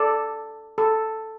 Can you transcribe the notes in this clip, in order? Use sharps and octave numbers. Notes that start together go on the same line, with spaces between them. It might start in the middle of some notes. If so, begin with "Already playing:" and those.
Already playing: A4 D5
A4